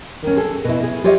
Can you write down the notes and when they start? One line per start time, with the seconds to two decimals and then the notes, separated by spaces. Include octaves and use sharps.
0.23 D#3 C#4
0.37 G#4 A4
0.65 B2 E4
0.83 G#4
1.04 F4 G4 C#5 D#5 E5 F#5